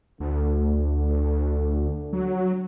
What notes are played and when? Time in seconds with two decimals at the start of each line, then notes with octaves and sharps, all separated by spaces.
0.20 D2 D3
2.13 F#3